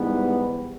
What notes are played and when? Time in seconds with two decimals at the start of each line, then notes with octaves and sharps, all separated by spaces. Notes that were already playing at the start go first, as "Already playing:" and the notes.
Already playing: G#2 E3 G3 B3